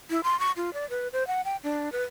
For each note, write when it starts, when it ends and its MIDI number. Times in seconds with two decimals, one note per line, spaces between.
0.10 0.21 64
0.24 0.39 84
0.39 0.52 85
0.57 0.73 65
0.74 0.88 74
0.90 1.08 71
1.13 1.26 72
1.27 1.41 78
1.45 1.56 79
1.64 1.92 62
1.92 2.03 71